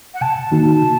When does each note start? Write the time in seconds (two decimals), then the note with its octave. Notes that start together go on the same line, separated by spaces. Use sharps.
0.14 F#5
0.21 C3 A5
0.52 D#3 A#3 D#4 F#4
0.81 C3